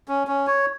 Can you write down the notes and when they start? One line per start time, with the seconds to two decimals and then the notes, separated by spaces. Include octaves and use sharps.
0.08 C#4
0.27 C#4
0.47 C#5